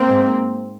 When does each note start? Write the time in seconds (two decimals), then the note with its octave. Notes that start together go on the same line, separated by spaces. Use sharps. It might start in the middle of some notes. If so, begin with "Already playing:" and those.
Already playing: A#3 C4
0.09 G#2